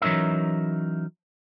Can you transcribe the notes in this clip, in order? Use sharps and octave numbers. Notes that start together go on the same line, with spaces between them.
E3 F#3 C#4 D#4 A#4 E5